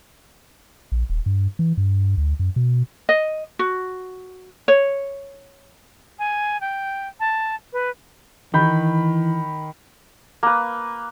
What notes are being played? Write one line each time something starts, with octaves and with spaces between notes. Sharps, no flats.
A#1
D#1
G2
E3
G2
D2
F#2
B2
D#5
F#4
C#5
G#5
G5
A5
B4
D#3 E3 B5 G6
A#3 B4